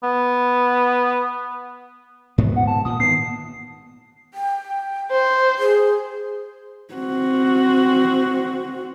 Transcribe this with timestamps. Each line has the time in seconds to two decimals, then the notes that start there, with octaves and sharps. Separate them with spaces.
0.03 B3
2.38 G#2 B3
2.56 F#5
2.67 A5
2.85 A#2 D#6
3.00 D#3 B3 C7
4.34 G5
5.11 C5
5.59 G#4
6.94 C4 F#4